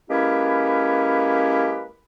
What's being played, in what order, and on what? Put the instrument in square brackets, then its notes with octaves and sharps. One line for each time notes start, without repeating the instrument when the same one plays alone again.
[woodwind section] G#3 A#3 C#4 E4 G4 B4